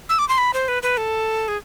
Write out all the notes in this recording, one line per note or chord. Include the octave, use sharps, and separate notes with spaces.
E6
D6
C6
B5
C5
B4
B4
A4
G#4